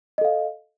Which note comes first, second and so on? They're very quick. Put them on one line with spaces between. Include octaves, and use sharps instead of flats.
D#5 A4 F5